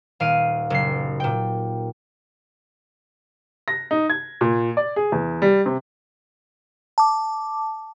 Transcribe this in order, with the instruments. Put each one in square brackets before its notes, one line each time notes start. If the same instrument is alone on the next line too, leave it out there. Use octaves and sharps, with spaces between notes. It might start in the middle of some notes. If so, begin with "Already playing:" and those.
[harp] D#1 F5 D7 D#7
F#1 C7
A#2 G5
[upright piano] A#6
D#4
G#6
A#2
D5
G#4
E2
G3
C3
[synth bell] A5 D6